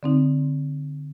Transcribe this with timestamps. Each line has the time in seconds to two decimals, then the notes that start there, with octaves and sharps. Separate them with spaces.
0.03 D3 C4 D#4